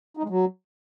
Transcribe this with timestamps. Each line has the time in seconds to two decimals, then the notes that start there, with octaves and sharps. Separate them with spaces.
0.17 D#4
0.23 G#3
0.29 F#3